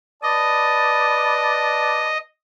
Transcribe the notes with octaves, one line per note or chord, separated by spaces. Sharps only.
B4 D5 D#5 A5